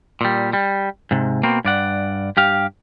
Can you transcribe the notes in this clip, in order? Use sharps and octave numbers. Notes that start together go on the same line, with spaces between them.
A#2 G3
G3
G#2 C3
B2 A#3 C4
G2 D5 F#5
G2 G4 F5